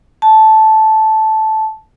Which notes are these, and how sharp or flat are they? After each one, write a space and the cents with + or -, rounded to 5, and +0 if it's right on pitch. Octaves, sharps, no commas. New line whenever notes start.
A5 -10